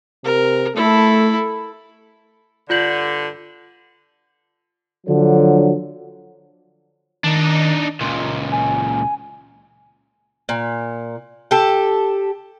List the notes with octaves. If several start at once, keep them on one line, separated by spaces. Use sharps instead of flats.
C3 A#4
A3 E4 A4
G2 D3 F4 G6 F#7
D3 F3 F#3
D#3 D4 D#4
C#2 A#2 C6
G#5
A#2
G4 A4